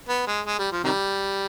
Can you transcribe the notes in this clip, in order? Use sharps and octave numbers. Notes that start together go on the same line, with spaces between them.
B3
G#3
G#3
G3
F3
C3 D#3 G3